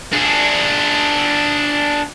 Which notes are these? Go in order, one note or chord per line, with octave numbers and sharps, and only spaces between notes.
D4 G#4